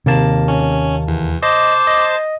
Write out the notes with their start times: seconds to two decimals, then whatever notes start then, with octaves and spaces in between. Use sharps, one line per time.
0.06 D#2 C3 A#3 A5
0.48 C#4
1.07 E2
1.43 C5 D#5 A5 D6
1.87 D#5